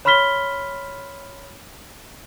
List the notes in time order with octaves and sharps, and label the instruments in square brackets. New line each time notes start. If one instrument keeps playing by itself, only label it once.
[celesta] C#5 B5 C6 F6 B6 G7